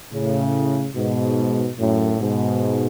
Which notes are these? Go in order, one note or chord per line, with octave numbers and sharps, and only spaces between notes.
A2 C#3
G#2 B2
F#2 A2
G#2 B2